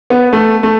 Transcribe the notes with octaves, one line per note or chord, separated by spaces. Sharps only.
B3
A3
A3